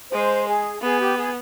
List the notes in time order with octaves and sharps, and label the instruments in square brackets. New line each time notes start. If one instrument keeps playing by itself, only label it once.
[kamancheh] G#3 [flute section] C5
[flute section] G#4
[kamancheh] B3 [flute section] G#4
[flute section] G4
G#4